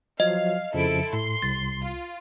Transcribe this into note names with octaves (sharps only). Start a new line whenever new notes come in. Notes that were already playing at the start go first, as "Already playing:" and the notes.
F3 F#3 D#5 F5
F2 C#3 F3 E4 A4 D7
A2 C6
C2 A6
F4